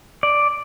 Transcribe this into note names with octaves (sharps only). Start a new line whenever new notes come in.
D5